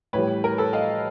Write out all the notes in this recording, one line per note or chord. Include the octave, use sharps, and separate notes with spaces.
A2 E3 G3 B4 C#5
A#4
A4 B4
D#5 F5